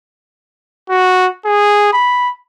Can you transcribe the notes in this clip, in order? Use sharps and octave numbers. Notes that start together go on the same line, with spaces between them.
F#4
G#4
B5